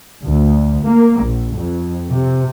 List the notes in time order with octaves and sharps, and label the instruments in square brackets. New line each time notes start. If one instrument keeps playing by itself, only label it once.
[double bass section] D2
A#3
A#1
F2
C3